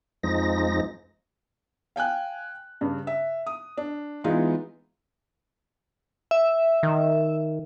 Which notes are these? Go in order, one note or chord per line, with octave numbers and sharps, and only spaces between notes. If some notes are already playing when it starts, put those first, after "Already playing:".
F2 F3 G#3 D#4 A#6
F5 G5 G#5 F#6
G2 C#3
E5
D#6
D4
E3 G#3 B3 D#4 F4
E5
D#3